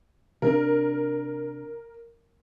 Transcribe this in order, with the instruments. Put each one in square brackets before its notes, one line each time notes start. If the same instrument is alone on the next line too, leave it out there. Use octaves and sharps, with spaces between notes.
[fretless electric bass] C3 C4 D4 [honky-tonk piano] A#4